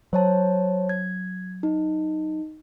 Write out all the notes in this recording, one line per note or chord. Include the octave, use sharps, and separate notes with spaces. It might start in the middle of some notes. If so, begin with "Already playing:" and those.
F#3 C5 C#5 A5
G#6
D#4